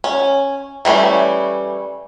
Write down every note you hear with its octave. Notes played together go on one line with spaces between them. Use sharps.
C#4
E3 G3 A3 C#4